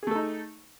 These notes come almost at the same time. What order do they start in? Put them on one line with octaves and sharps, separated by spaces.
G#4 A3 A4 D#4